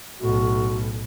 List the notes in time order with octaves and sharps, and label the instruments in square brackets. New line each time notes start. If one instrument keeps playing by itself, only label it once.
[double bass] B1 A2 [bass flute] F#4